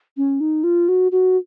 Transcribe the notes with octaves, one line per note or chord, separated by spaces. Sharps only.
C#4
D#4
F4
F#4
F#4